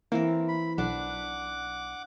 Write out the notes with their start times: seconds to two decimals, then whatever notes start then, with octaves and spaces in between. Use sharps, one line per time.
0.12 E3 A#3 C4 A#4
0.48 B5
0.78 B1 D4 F#5 D6